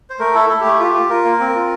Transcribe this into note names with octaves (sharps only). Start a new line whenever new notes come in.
C5
A3 A#4
E4 A4
E4 A4
A3 G4
F4 G4
F4
F4 A#4
A#3
C4
F4